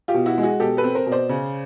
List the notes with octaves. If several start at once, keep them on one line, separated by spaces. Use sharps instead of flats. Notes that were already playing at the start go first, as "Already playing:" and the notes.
F4 G4
B2
E4 F#4
G#3
F#4 G#4
B2 G4 A4
A4 B4
C4
A#4 C5
B2
C5 D5
C#3